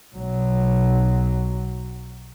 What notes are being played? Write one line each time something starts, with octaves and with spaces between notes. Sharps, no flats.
B1 F#3